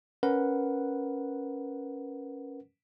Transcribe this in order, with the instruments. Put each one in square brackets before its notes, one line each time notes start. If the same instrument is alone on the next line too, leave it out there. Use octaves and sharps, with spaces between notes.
[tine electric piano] C#4 A#4 B4 F#5